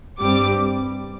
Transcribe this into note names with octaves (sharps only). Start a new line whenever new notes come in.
G2 G3 C4 D6